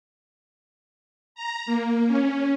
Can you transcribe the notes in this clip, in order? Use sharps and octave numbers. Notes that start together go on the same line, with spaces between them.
A#5
A#3
C#4